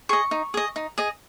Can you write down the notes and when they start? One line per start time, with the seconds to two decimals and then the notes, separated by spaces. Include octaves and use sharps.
0.09 G#4 D#5 C#6
0.31 D#4
0.54 G#4 D#5
0.76 D#4
0.98 G#4 D#5